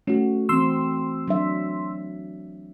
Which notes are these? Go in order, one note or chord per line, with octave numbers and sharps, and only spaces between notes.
A3 C#4 F#4
E3 C4 C6 E6
F#3 D4 E5